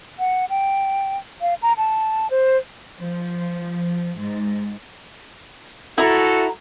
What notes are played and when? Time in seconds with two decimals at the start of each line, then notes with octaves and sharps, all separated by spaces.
0.19 F#5
0.50 G5
1.41 F5
1.62 A#5
1.78 A5
2.31 C5
2.99 F3
4.18 G#2
5.98 E4 F#4 A4 A#5